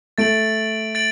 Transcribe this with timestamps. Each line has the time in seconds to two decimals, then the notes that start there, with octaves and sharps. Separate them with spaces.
0.18 A3 A6 D7 F#7
0.95 A6 D7 F#7